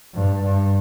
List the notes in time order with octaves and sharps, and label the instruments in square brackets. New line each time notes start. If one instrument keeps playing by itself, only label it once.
[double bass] G2
G2